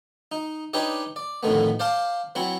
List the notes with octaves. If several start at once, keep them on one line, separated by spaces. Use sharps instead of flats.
D#4
D4 D#4 G4 B4 C#5 D#5
D5
F2 A2 D3 D#3 A3 B3
C5 D5 F5 A5 C6
E3 F#3 C4 B5 C#6